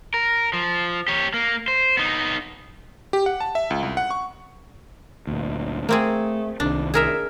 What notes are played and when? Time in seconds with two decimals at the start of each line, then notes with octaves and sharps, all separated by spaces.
0.14 A#4
0.53 F3
1.08 G4 C#5
1.34 A#3
1.68 C5
1.97 B3 D#4
3.13 G4
3.26 F#5
3.40 A5
3.55 E5
3.70 C#2
3.83 C2
3.97 F#5
4.11 C#6
5.27 D2 A#2
5.89 A3 A#3 C4 G#4
6.60 C2 D#3 D4
6.94 G#4 A#4 E5